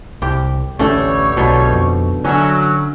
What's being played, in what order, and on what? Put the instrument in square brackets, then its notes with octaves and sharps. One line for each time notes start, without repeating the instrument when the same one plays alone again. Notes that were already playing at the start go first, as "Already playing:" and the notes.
[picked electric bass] C2 [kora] G4
[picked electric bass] A1 D2 C#4 [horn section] G3 B3 C#5 [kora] A3
[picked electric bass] B1 [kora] B2 D3 D#4
[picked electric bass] F2
[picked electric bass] D3 [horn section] F#3 [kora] C#4 E5